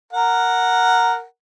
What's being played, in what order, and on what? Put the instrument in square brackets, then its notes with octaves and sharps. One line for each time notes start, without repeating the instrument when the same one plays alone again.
[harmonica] A#4 F#5